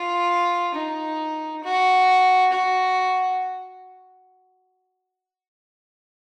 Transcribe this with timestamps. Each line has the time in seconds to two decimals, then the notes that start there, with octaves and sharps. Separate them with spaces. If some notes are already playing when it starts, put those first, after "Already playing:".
Already playing: F4
0.74 D#4
1.64 F#4
2.53 F#4